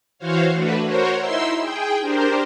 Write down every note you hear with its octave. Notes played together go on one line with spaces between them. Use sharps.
E3 F#4 C5 C#5 F5
A3 D4 F#4 B4
F#4 A#4 C5 C#5
D#4 E4 C6 E6
G#4 G5
D4 G4 A#4 C5